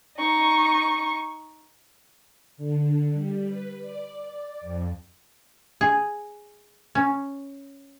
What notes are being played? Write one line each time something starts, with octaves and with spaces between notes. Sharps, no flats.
D#4 C#6
D3
G3
B4
D5
D5
F2
G#4
C#4